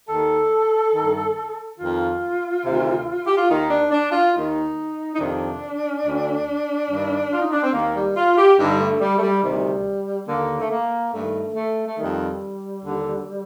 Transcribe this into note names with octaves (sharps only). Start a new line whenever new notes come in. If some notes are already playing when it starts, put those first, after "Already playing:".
D#2 D#3 A4
G2 D#3
F2 D#3 F4
D2 C3 D#3
G4
F4
D#2 D#3 D#4
D4
D4
F4
D#2 D#3 D#4
D#4
F2 C3 D#3 D4
D2 D3
G2 D#3
F4
D#4
D4
C4
D#2 D#3 A#3
G3
F4
G4
G2 D3 D#4
G3
A3
G3
A3
G3
D2 C3 D#3 G3
D#2 D3 A#3
A3
A#3
G2 D#3 A3
A3
A3
F2 D#3 G3
D#2 D3